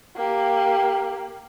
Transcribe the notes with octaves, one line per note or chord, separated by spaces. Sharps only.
A#3 G4